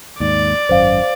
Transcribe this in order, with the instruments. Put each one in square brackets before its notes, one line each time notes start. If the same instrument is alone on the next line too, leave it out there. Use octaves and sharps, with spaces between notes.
[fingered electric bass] D#2 G#2 [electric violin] D5
[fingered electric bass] G#1 F#2 [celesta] C5 F5